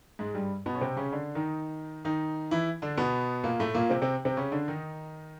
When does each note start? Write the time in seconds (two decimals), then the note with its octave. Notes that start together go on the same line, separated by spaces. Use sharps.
0.19 G#2 G#3
0.34 G2 G3
0.66 B2 B3
0.75 C#4
0.81 C3 C4
0.96 C#3 C#4
1.12 D3 D4
1.35 D#3 D#4
2.05 D#3 D#4
2.51 E3 E4
2.82 D3 D4
2.97 B2 B3
3.44 A#2 A#3
3.60 A2 A3
3.74 A#2 A#3
3.90 C3 C4
4.02 C3 C4
4.25 C3 C4
4.37 C#3 C#4
4.52 D3 D4
4.68 D#3 D#4